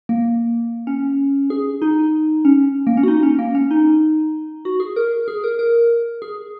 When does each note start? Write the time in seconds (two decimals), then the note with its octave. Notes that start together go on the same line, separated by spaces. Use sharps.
0.09 A#3
0.87 C#4
1.50 G#4
1.82 D#4
2.45 C#4
2.87 A#3
2.97 C#4
3.03 F#4
3.08 D#4
3.23 C#4
3.39 A#3
3.55 C#4
3.71 D#4
4.65 F#4
4.80 G#4
4.96 A#4
5.28 G#4
5.44 A#4
5.59 A#4
6.22 G#4